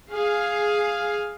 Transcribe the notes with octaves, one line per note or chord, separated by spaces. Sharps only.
G#4 F5